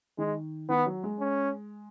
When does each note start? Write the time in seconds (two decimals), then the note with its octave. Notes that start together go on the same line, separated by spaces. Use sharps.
0.18 D#3 G#3
0.69 D#3 B3
0.86 F#3
1.03 G#3
1.20 C#4